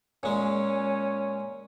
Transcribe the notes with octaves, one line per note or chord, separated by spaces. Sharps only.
A#2 G#3 C#4